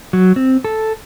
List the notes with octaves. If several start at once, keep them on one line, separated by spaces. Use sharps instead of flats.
F#3
C4
A4